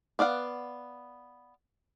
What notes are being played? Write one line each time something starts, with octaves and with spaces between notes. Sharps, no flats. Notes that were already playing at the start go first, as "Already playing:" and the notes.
B3 D5 F5 F#5